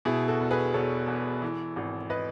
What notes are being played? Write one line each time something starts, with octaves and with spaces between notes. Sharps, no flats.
B2 E4 G#4
F#4 A4
E1
G#4 B4
E1 A4 C#5
E2
E3
G#1
B4 D#5